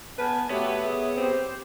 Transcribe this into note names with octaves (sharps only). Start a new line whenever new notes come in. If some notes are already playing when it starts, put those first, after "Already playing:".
B3 B4 G#5 A5
A3 B3 F#4 G4 B4 C#5
G#4 E5
C4 G4 C5